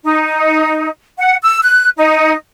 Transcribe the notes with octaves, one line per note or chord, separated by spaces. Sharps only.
D#4
F#5
E6
F#6
D#4